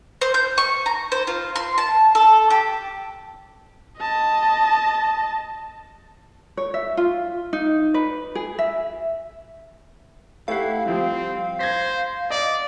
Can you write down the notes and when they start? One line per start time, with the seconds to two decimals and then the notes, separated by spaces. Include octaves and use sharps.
0.21 C5
0.34 G6
0.58 C#6
0.86 A#5
1.12 C5
1.27 F4
1.56 C6
1.78 A5
2.15 A4
2.50 G4
3.99 D#5 A5
6.57 C#5
6.74 E5
6.97 F4
7.53 D#4
7.94 B4
8.35 G#4
8.59 E5
10.48 A3 E4 G4 F5 F#5
10.86 F3 G3 C4
11.59 C5 G#6 A#6 B6
12.30 D5 D#5 F5